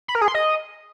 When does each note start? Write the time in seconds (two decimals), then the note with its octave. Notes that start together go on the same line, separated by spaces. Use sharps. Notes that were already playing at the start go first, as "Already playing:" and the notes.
0.08 B5
0.15 A#4
0.21 G#4
0.28 C6
0.34 D#5